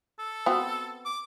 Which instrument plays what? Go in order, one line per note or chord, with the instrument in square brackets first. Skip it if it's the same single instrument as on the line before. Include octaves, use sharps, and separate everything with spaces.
[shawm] A4
[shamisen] B3 C4 F#4
[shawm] D6